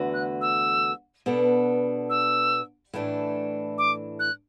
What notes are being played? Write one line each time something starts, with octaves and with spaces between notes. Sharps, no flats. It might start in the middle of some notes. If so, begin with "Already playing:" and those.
Already playing: E2 D3 A3 F#4 B4
F#6
E6
B2 B3 D4 A4
E6
A2 E3 A3 D4 A4
D6
F#6